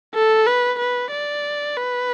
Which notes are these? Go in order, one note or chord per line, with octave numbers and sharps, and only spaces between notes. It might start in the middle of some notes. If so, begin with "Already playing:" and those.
A4
B4
B4
D5
B4